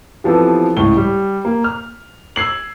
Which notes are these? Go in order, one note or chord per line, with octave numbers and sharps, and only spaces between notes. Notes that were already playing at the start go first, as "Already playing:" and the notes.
E3 F3 B3 C4 G4 A4
C#2 A2 G7
G3
A#3
F6
E6 G#6 C7 F#7